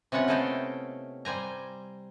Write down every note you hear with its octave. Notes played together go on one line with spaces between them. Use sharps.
C3 B3 C#4 F4 F#5
A3 E4 A4 D#5 F5 G5
G3 C5 G#5 A#5